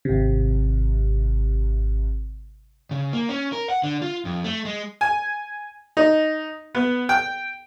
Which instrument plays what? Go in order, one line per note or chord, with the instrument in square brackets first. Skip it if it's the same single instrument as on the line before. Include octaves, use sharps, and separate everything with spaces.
[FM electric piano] G#1 C3
[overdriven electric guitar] C#3
A#3
C#4
A#4
F#5
D3
F4
F2
A3
G#3
[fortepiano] G#5
D#4
B3
G5